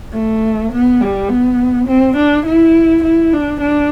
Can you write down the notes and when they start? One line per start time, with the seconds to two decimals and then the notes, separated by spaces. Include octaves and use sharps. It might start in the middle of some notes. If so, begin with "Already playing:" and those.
0.14 A3
0.72 B3
1.01 G3
1.29 B3
1.88 C4
2.17 D4
2.46 E4
3.04 E4
3.33 D4
3.61 D4